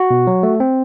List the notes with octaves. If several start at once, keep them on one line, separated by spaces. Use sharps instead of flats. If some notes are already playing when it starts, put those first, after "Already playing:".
Already playing: F#4
B2
F#3
A3
C4